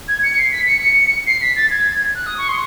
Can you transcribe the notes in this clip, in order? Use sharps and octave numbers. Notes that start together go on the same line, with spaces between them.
G#6
C#7
C7
B6
C#7
C#7
C7
B6
A6
G#6
F#6
D#6
C#6
C6